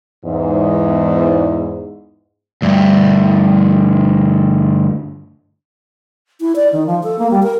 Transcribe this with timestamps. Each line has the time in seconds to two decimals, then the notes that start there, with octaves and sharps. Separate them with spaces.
0.25 E2 G#2
2.62 D2 G2
6.41 E4
6.56 D5
6.73 D#3
6.86 F3
7.03 A4
7.19 A#3
7.31 G3
7.43 A#4